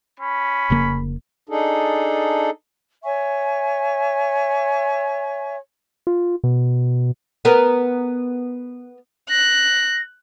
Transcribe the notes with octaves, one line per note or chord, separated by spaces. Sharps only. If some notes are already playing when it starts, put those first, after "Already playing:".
C#4 B5
F1 C#3 A#3
D4 D#4 G#4 A4
C#5 E5 G#5 C#6
F4
B2
B3 A#4
F#6 A#6